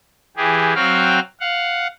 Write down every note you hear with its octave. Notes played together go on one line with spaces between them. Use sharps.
E3 G4 G#4
F#3 C4 F#4 F5 G5 F6
F5 F#5